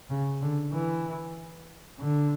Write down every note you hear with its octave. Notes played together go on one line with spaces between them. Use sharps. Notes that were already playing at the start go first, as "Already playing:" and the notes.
C#3
D3
E3
D3